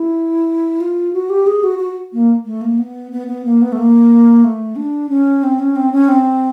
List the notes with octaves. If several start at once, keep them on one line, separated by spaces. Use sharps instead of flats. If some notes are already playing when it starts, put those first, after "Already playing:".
Already playing: E4
F4
F#4
G4
G#4
F#4
F#4
A#3
A3
A#3
B3
B3
B3
A#3
B3
A3
A#3
A3
D4
C#4
C4
C#4
C4
C#4
C4